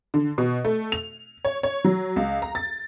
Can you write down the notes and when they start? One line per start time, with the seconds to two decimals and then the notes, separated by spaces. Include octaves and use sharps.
0.14 D3
0.38 B2
0.65 A3
0.92 F7
1.45 C#5
1.63 C#5
1.85 F#3
2.16 C#2
2.42 A#5
2.55 A6